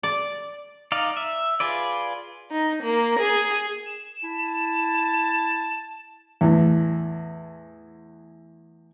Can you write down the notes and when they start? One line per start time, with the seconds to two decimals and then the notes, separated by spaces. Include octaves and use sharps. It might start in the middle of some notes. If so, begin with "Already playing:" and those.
0.03 D5
0.92 D#4 D5 F5
1.17 E5
1.60 F4 G#4 B4 D5
2.50 D#4
2.83 A#3
3.18 G#4
3.86 E7
4.24 E4 A5
6.41 E2 A2